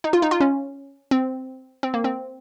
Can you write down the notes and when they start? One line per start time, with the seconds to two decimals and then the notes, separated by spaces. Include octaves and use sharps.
0.04 D#4
0.13 F4
0.22 D#4
0.31 F4
0.40 C#4
1.11 C4
1.83 C4
1.94 A#3
2.04 C4